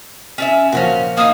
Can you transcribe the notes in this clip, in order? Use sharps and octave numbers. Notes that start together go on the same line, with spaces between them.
C#4 D5 E5
A#2 F3 C#4 E4 F#4
A#3 D#4 F5 D#6